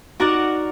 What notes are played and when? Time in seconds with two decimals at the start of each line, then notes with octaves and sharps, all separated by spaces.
0.20 D#4 F#4 A#4 D5 F#5